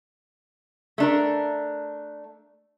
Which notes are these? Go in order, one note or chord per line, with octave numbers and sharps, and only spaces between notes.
A3 D4 A#4